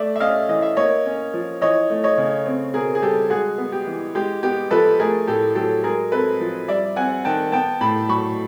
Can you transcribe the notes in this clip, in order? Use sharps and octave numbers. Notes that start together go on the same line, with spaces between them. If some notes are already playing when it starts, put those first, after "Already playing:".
Already playing: A3 D5 E5
E5
C#4 D#5 F5
E3 D#5
E5
A#3 C#5 D#5
C#4
F3
E3 C#5 D#5
A3
C#5 D#5
C#3
C4
B2 G#4 A#4
G#4
G3 G4 A4
G#3 F#4 G#4
B3
G4
E3
G#3 G4
B3 G4
F3 A4 B4
A3 G#4 A#4
A2 G4 A4
F#3 G4 A4
G#3 G#4 A#4
C4 A4 B4
F3
G3 D5 E5
C4 F#5 G#5
D#3 G5 A5
B3 G5 A5
A2 A5 B5
F#3 B5 C#6